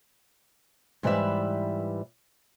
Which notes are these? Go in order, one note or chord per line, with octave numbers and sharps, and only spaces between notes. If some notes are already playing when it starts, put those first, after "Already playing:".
G#2 E3 G3 B4 D5 E5